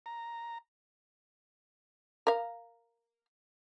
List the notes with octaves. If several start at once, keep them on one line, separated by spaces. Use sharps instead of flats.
A#5
A#4 F5